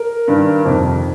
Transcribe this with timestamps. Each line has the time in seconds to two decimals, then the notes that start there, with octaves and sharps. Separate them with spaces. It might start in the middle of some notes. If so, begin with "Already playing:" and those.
Already playing: A#4
0.28 G2 D#3
0.65 F2 C3 D#3